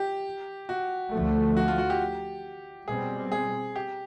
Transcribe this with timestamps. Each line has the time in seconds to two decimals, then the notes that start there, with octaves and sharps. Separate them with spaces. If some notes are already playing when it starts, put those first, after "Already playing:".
Already playing: G4
0.69 F#4
1.13 D2 D3 F3 A3
1.57 F#4
1.68 F4
1.78 F#4
1.90 G4
2.88 B2 G3 C4 G#4
3.32 G#4
3.76 G4